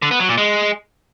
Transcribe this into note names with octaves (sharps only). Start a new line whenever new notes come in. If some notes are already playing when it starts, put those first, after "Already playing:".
D3
B3
F#3
A#2
G#3